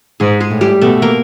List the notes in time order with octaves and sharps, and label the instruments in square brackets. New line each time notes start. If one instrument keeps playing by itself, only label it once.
[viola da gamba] G#2 [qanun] G#3 G#4
[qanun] G#3 G#4
[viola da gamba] A2
[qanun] G3 G4
[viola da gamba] B2 [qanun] A3 A4
[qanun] A#3 A#4